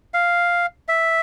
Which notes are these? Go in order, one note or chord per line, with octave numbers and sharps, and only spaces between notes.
F5
E5